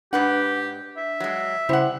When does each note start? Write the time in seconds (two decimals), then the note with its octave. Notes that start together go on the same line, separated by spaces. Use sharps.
0.13 G#2 D4 G4 B4 F#5
0.97 E5
1.20 F#3 G#3
1.69 C#3 G3 E4 C5 F#5